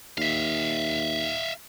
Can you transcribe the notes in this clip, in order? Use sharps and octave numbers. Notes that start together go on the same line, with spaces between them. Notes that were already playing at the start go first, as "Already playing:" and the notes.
D#2 E5 F5